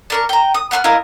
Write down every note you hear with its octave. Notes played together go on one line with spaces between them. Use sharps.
D4 A#4 C#6
G5 A#5
D#6
B3 F#5 C6 F6
E4 F4 A#4 D#5